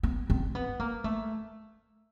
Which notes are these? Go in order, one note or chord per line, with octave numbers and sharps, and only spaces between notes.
B3
C4
B3
A#3
A3